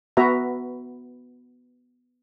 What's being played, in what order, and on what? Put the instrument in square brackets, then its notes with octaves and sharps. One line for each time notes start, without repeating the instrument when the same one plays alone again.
[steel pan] B3 F#4 B4 E5 A#5